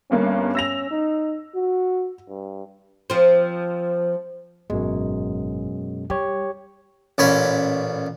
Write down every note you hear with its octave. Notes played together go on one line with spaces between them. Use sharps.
G1 G2 A#3 C#4
E6 A#6 F7
D#4
F#4
G2
F3 C4
G#1 F#2 B2 G#3
G3 G4 C#5
A1 A#2 C#4 C#5 B5